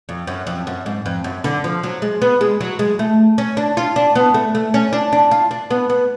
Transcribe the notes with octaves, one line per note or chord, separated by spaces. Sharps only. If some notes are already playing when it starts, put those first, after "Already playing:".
F2
F#2
F2
F#2
G#2
F2
F#2
D3
F3
F#3
G#3
B3
G#3
F#3
G#3
A3
C#4
D4
F4
D4
B3
A3
A3
C#4
D4
D4
F4
D4
B3
B3